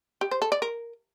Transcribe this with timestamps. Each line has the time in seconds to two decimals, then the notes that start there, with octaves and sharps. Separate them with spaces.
0.21 G4
0.31 C5
0.42 A4
0.52 D5
0.62 A#4